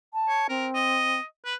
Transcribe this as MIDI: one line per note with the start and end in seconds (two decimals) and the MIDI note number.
0.13 0.47 81
0.28 0.46 73
0.49 1.20 60
0.49 0.66 70
0.75 1.23 75
1.45 1.55 71